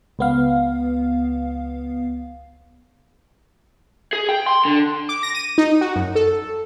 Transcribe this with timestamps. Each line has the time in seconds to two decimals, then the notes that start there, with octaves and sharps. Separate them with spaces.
0.19 C#2 B3 F5
4.13 G#4
4.29 G5
4.46 C6
4.65 D3
5.09 D6
5.23 A#6
5.35 D#7
5.58 D#4
5.81 F#4
5.96 F#2
6.15 A4